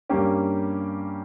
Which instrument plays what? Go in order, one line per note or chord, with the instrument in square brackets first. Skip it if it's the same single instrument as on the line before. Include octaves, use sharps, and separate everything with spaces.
[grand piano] G2 G3 A#3 C#4 G4